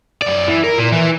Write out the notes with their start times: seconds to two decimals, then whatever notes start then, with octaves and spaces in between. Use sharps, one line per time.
0.22 F#2 D5
0.48 E3
0.64 A#4
0.78 A#2
0.92 E3